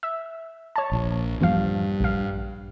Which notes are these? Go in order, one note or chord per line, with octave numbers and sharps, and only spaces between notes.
E5
C#5 A5
A#1
E2 G2 F3 F5
A#1 F5